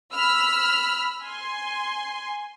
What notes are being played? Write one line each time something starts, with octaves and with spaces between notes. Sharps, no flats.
B5 E6 F6
G#5 C6